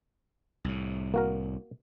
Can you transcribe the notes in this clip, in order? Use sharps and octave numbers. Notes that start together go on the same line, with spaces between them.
C2 A2
A#3 F#4 A#4